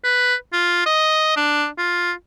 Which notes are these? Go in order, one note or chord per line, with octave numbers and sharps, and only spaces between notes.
B4
F4
D#5
D4
F4